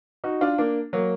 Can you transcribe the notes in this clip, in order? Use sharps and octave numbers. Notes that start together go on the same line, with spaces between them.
D#4 F#4
D4 F4
A#3 D4
F#3 A#3